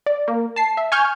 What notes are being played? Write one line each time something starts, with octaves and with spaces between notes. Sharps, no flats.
D5
A#3
A5 C7
E5
G#5 C#6 F6 G6 G#6